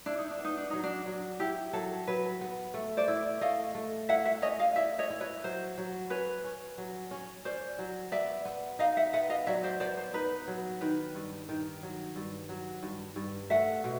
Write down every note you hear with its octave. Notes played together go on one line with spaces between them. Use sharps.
D4 E4
D#4
D4
B3
D#4
D4
F#3 D#4
D4
F#3
E4 G4
F#3 A4
F#3 B4
B3
A3
C5 D5
E4
A3 D#5 F5
A3
E4 E5 F#5
E5 F#5
C#4 C#5 D#5
D#5 F5
E4 D5 E5
C#5 D#5
E4
B4 C#5
F#3 C5
F#3
C#4 B4 C#5
C#4
F#3
C#4
C#4 C5 D5
F#3
B3 D5 E5
B3
D#4 D#5 F5
E5 F#5
B3 E5 F#5
D#5 F5
F#3 D5 E5
C5 D5
B3 C5 D5
C5
D#4 B4
F#3
D#3 B4
G2
D#3
F#3
G2
F#3
G2
G2
A3 E5 F#5
B2